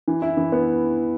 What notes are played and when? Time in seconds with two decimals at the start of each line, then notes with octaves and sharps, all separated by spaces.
0.08 E3
0.22 E4
0.37 E3
0.52 B3